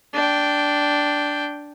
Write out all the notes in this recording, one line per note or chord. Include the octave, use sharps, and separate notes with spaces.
D4 G5